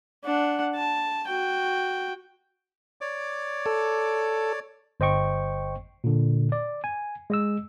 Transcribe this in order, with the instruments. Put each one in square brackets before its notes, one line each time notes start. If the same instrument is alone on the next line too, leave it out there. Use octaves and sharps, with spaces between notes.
[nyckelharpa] D4 F#5
A5
F#4 G5
[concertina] C#5 D5 D6
[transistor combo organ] A4
[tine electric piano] G1 C5 D#5 G5 C#6
A#2 D3
D5
G#5
G#3 D#5 E6